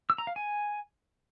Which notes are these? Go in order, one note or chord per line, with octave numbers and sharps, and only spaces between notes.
E6
A#5
F5
G#5